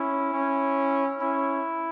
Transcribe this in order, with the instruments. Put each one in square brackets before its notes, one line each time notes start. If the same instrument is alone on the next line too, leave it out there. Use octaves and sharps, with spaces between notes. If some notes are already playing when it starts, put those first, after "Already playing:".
Already playing: [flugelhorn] C#4 [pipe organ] E4
[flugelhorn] C#4
[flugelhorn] C#4 [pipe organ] E4